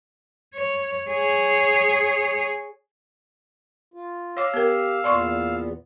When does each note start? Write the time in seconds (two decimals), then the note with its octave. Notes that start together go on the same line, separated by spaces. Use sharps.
0.55 C#5
1.10 G#4 C#5
3.94 F4
4.37 C#5 F5 D6 E6
4.54 B3 G4 A#4
5.04 E2 A#2 B3 D5 C6 C#6